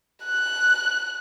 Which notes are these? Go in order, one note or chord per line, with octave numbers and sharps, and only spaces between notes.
F#6